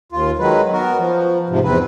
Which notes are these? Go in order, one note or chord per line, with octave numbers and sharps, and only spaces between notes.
D#2 F4
D#3 F#3 G#3 B4
B3 F#4 A#4
F3
G#2 C3 F3
E2 C3 C4 B4